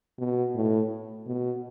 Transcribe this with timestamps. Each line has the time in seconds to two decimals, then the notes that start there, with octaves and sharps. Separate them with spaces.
0.19 B2
0.55 A2
1.27 B2